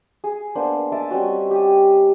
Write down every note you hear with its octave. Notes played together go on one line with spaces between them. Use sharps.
G#4
A#3 B3 D4 C5
D#5 E5 A5 D6
G3 C4 C#4 F#4
G4 D#6